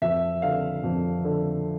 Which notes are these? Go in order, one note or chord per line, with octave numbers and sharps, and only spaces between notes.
F2 E5
D3 F5
F2
D3